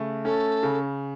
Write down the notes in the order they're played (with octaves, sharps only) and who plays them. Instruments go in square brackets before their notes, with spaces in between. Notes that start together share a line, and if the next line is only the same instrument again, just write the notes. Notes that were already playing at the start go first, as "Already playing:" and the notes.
Already playing: [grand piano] C#3 A3
[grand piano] C#4 [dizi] A4
[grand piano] C#3